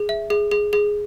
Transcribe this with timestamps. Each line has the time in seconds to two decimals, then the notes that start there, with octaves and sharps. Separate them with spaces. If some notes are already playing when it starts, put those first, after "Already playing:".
Already playing: G#4
0.09 E5
0.30 G#4
0.51 G#4
0.73 G#4